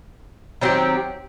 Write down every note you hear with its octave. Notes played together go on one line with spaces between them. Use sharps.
D#3 F#3 C4 G4